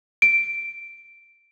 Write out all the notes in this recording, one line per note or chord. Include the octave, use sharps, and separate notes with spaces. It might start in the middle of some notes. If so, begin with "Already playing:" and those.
D7